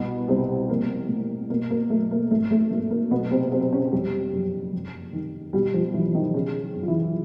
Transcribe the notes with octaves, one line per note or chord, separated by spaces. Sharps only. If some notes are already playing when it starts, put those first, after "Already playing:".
Already playing: C2 B2 B3
C2 C3 C4
F3 A#3
A2
B2 A#3
A#3
F#3 A3
A#3
G#1 A3
A3
G#1 A#3
A#3
B2 F#3 B3
C3 C4
C3 F#3 C4
C#3 C#4
F2 G3 G4
F#1
F1
D#3
B2 G3 G4
F3 F4
B1 E3 E4
D#3 D#4
C#3 F3 C#4
F#2
F4
E3 E4